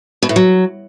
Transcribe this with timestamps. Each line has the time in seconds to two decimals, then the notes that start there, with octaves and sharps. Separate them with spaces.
0.23 B2
0.29 A2
0.36 F#3